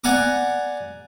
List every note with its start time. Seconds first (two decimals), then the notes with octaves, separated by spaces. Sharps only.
0.04 D5 F#5 G#5 A#5 D6